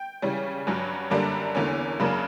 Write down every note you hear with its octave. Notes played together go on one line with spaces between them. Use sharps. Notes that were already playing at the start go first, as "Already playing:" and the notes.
Already playing: G5
C#3 E3 G3 C#4
G2 F#3 C#4
F#2 D3 G3 A#3 D4
E2 D3 A#3 C#4
F#2 C#3 F#3 A#3 D4 B5